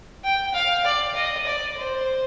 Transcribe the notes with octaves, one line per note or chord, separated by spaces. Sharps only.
G5
F5
D5
D#5
D5
C5